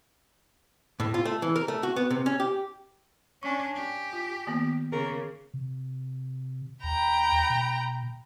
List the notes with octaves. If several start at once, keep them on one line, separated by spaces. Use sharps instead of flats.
A2
F4
A3
E3
A#4
A3
F#4
B3
C3
C#4
G4
C#4 D4 G#5 C#6
G4
F4
D#3 A#3 B3
C#3 G#4 A#4
C3
D#2 G5 A#5 B5
B2